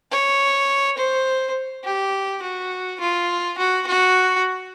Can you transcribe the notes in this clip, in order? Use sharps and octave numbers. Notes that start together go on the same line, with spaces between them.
C#5
C5
G4
F#4
F4
F#4
F#4